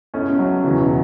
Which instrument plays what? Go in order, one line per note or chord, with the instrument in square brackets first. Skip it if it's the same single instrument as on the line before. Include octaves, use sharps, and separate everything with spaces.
[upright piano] C#2 B2 A3 E4 [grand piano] C#4
[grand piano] F#3
[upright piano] E2 E3 B3 E4 [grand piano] C#3
[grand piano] B2